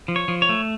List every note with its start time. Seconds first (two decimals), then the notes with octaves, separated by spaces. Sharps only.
0.08 F3
0.16 C#5
0.28 F3
0.42 C#5
0.49 A3